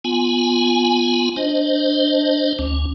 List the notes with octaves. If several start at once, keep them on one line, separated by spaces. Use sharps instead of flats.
B3 F4 G#5
D4 C5 D#5
D2 C#4